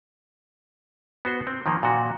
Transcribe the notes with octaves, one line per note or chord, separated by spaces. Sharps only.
B3 F#4 C5
C4
D#3 F3 A#3
A#2 F#4